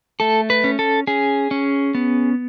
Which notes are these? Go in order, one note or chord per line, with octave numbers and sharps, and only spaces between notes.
A3 A4
B4
C#4
A4
C#4 G#4
C#4
B3